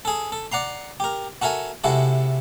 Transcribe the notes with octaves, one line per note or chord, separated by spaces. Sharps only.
G#4 A4
A4
D5 F#5 A#5 C6
G4 A#4
F#4 A4 A#4 E5 G#5
C3 G#3 E4 F#4 A4